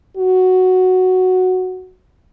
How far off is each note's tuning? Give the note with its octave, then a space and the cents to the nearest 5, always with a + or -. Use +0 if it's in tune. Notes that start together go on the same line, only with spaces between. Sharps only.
F#4 +0